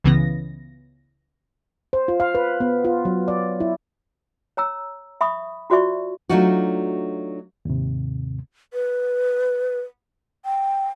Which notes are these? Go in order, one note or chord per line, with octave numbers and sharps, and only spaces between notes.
C#2 C#3 E3 B3 A#6
C5
F4
F5
B4
B3
F4
F#3
D5
E4
C#5 A#5 E6
E5 B5 C#6 D#6
F4 F#4 C5 D5 E5 C#6
F#3 A3 D4 D#4 F4 F#4
D#2 G#2 C3
B4
G5